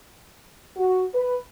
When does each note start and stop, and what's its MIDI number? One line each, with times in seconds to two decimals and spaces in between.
0.76 1.04 66
1.14 1.37 71